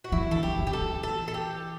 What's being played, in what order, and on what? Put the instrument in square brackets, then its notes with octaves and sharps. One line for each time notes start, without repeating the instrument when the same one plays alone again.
[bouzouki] F#4
[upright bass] E3 [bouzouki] E4
[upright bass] D3 [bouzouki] A4
[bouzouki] G4
[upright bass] D3
C#3
[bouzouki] G4
A4
[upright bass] E3
[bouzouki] A4
A4
G4